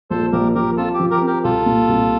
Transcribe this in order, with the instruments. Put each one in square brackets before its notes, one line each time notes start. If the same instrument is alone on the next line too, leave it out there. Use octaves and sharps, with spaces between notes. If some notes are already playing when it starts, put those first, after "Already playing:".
[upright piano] A#1 [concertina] A4 C5
[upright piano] A#1 [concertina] G4 A#4
[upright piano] F3 [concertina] G4 A#4
[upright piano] C4 [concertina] F4 A4
[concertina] G4
[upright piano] F3
[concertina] G4 A#4
[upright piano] C4
[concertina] G4 A#4
[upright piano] C2 [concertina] F4 A4
[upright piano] A#2
C2